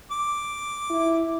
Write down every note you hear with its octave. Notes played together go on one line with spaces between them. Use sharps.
D6
E4